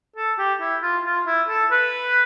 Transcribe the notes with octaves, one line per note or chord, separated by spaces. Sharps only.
A4
G4
E4
F4
F4
E4
A4
B4